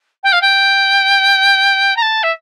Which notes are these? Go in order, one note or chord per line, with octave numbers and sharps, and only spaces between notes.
G5
F5
G5
A#5
A5
E5